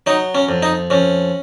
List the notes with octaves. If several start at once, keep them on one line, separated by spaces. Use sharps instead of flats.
F#3 D#4
C#4
F2
D#4
F2 C#4